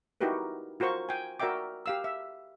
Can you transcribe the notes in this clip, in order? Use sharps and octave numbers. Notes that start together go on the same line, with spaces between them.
D#4 E4 F#4 G4 A#4 B4
F4 F#4 A#4 C5 C#6
G5 G#5
F#4 A#4 D5 E5 G5 D6
G4 F5 E6
E5